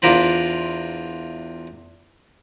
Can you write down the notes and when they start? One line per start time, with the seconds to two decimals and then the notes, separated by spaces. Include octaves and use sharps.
0.02 E2 D4 F4 A#4 C5 B5